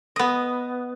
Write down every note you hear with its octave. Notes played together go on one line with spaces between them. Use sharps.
B3 D#5